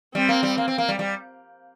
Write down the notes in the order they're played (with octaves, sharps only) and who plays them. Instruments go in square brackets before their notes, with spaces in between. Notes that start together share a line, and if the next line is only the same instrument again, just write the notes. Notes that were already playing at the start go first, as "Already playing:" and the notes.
[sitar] G3 [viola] C4
[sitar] A#3
G3
A#3
C4
A#3
G3
G3